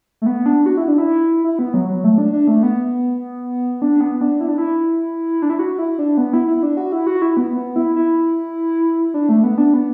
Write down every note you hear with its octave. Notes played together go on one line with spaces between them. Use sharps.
A3
B3
D4
F#4
E4
D4
E4
E4
B3
F#3
F#3
A3
D4
D4
A3
B3
D4
B3
D4
E4
D4
E4
D4
E4
F#4
E4
D4
B3
E4
E4
D4
F#4
E4
F#4
E4
B3
B3
E4
E4
D4
A3
B3
D4
B3